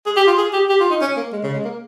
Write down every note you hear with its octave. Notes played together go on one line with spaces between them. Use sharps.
G#4
G4
F4
G#4
G4
G4
F4
D#4
C#4
A#3
G#3
C#3
G#3
A#3